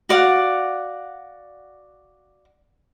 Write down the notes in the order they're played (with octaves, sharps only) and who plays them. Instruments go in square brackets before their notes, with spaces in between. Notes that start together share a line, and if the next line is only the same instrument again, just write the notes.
[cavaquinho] F#4 D5 F5 F#5